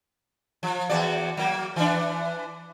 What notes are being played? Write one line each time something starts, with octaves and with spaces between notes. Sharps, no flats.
F3
E2 F#4 D5
F#3 A#3
E3 D4